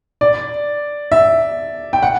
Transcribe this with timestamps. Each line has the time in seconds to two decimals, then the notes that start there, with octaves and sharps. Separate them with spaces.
0.21 D5
1.12 E5
1.93 G5
2.02 F#5